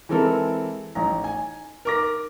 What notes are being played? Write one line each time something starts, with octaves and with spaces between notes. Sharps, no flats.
E3 G#3 C4 A4 A#4
A1 A#5
G#5
A#4 D6 A#6